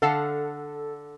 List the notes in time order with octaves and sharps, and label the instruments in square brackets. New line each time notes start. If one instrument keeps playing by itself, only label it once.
[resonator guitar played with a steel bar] D3 F5 F#5 [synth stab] A4